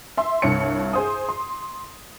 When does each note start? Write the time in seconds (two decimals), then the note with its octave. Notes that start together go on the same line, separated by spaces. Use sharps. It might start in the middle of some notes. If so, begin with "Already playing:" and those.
0.17 E5 C6
0.42 C2 G2 C#5 C#7
0.93 G#4 C5 D#6
1.29 C6